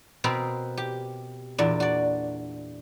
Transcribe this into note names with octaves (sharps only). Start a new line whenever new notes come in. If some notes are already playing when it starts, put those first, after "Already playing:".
B2 C4 A#4 B4
G4
E2 A#2 D4
F#4 D5